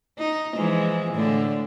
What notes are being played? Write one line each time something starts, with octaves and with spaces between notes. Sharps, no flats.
D#4
E3 F3 G#3
A2 D3